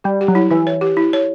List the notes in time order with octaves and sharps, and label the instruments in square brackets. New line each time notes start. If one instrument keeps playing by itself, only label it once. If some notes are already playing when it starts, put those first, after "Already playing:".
[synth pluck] G3 [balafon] G4
[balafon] G4
[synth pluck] F#3
[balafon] E4
[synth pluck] E3 [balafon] E4
[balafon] C#5
G4
E4
C#5